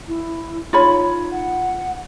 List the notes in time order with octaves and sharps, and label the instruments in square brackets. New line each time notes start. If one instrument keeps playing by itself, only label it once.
[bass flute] E4
[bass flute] D#4 [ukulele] F4 C#5 B5
[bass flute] F#5